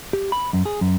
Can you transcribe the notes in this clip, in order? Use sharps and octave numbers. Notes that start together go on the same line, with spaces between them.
G4
B5
F#2
G#4
F#2